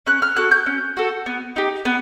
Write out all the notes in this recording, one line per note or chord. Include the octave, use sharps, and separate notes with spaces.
C#4 F#6
F6
F#4 A4 F#6
G6
C#4
F#4 A4
B3
D#4 G4
B3